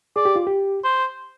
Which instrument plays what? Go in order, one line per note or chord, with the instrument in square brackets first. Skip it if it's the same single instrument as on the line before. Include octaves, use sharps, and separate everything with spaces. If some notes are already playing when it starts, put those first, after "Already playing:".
[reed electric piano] G#4 [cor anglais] D5
[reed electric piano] G4
F4
G4
[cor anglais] C5